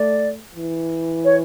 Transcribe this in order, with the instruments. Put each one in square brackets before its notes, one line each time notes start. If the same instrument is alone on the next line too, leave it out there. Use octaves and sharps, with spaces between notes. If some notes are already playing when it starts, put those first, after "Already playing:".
Already playing: [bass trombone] A3 [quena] D5
[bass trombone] E3
[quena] C#5